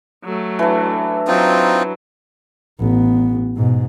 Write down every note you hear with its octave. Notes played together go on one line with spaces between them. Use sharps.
F#3 A3
E3 D4
F#3 C4 D#4 F4
A1 B3
G#2 B2